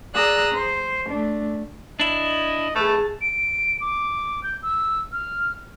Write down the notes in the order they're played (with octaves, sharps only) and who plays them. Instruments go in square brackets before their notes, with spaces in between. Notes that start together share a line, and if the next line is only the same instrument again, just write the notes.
[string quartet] G#4 D5 A#5 D#6 E6 F#6
C5
A3 D4
[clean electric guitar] D4 E4 [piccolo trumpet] D#5
[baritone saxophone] A3 [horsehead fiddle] G#4 A5 [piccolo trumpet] B4
[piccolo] D7
D6
G6
E6
F6